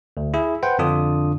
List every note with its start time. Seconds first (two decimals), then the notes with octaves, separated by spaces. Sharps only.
0.17 D2
0.34 E4 G#4 E5
0.63 B4 C5 F#5 G5
0.79 F2 D3 D4 F4 D#6